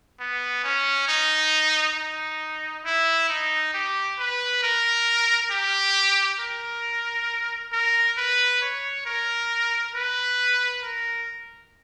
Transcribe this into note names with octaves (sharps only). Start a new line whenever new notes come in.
B3
C#4
D#4
D#4
E4
D#4
G4
B4
A#4
G4
A#4
A#4
B4
C#5
A#4
B4
A#4